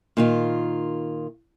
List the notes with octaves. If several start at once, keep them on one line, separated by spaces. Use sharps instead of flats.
A#2 D#3 F4